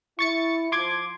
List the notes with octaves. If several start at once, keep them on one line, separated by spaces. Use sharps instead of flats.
E4 C#6 A6 C#7
F3 C6 D6 G#6